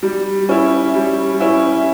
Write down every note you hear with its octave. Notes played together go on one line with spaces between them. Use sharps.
G3
C#4 E4
G3
C#4 E4